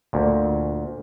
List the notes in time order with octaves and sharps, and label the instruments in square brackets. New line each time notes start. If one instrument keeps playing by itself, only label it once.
[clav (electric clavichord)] D2 A#2